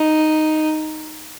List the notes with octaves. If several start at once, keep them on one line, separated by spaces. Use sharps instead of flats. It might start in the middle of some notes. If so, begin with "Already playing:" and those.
Already playing: D#4